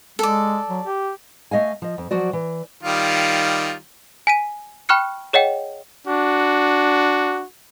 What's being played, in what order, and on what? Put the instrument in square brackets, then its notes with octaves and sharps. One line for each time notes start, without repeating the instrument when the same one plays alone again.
[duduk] G#3 [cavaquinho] A4 D5
[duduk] F#3
G4
[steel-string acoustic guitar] A3 D#5 F5 G#5
F3 D#5
F2
F3 F#3 F#4 C5 D5
E3
[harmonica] D#3 G3 F4
[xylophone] G#5 B6 D#7
G5 B5 C#6 F6 F#6 C#7
G#4 C#5 D#5 F#5 G5
[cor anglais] D4 [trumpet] F#4